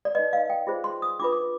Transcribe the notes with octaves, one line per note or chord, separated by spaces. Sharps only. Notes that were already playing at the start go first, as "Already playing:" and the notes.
D5
D#4 B4 D#5
F5
G5
F4 G#4 C5
C6
D#6
D4 F4 B4 D6
D6